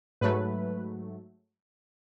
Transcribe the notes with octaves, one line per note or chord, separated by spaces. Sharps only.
G#2 F#3 A3 B4